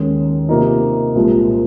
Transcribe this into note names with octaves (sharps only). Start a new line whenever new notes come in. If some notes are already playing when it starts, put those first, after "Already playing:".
Already playing: D#2 D#3 G#3 C#4
C3 F3 A#3 D#4
C2 A#2 F3 G#3 C4